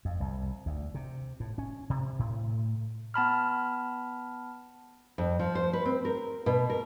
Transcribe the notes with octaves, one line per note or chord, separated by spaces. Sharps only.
F2
C2
D2
C3
A2
C#4
C3
A2
B3 A5 B5 F6
F2
F3
C5
B4
C4
A#4
B2
A#4